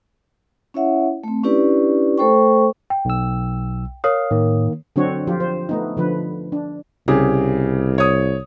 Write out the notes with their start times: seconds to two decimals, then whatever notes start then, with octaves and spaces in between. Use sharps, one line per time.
0.74 C#4 E4 C#5 E5 F#5
1.24 A3 C4
1.44 C#4 D4 E4 G4 B4 D5
2.18 A3 A4 C5 G5 C#6
2.90 G5
3.05 B1 E6
4.04 A#4 C#5 F5 D#6
4.31 A2 D#3 A#3
4.96 D3 F#3 C4 D4 F#4 C#5
5.27 F3 F4 G4
5.40 C5
5.69 A3 B3 D#4
5.97 D3 F3 B4
6.52 D4
7.08 C2 C#3 G4 G#4
7.98 C#5 D#6